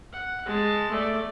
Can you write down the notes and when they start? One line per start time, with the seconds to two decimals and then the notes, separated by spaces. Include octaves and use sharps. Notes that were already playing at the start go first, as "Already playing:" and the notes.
0.13 F#5
0.46 G#3 A5
0.91 A3 D5